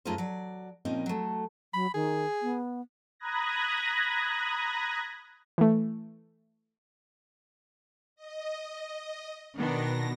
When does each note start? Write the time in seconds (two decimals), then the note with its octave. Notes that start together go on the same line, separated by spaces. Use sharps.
0.05 F#2 A3 D#4 F4 G#4 C5
0.18 F#3 D5
0.85 A#2 F3 A#3 C4 C#4 D#4
1.06 F#3 A3
1.74 F#3 B5
1.94 D#3 G#4
2.42 B3
3.20 A#5 B5 D#6 F#6 G#6 A#6
5.58 E3 A3
8.16 D#5
9.58 B2 D#3 B3 D4 A#6